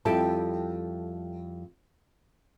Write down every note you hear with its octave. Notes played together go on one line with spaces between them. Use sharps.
F2 G3 E4 G4 A4 A5